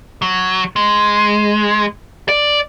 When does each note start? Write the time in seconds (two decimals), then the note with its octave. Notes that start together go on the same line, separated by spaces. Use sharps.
0.22 F#3
0.76 G#3
2.29 D5